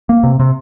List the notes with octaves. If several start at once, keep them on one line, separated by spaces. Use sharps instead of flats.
A#3
C3
C3